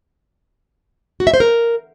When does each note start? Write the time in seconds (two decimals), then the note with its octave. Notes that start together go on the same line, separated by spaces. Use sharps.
1.20 F#4
1.27 E5
1.34 C5
1.40 A#4